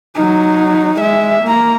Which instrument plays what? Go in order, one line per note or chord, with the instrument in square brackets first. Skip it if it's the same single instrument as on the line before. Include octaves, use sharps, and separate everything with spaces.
[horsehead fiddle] F#3 D#4
G#3 E5
A#3 A#5